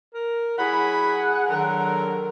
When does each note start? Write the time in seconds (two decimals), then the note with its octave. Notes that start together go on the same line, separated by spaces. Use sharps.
0.14 A#4
0.58 F#3 E4 G#4 F#5 B5
1.49 D3 D#3 F#3 A#4